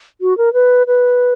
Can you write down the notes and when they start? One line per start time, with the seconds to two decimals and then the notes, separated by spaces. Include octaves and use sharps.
0.21 F#4
0.38 A#4
0.53 B4
0.87 B4